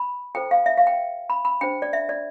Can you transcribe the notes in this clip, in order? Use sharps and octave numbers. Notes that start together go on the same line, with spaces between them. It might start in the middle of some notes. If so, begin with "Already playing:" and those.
Already playing: B5
F4 A4 C5 G5
F5
E5
F5
G5
B5
B5
D4 G4 C5 G5
D5
E5
D5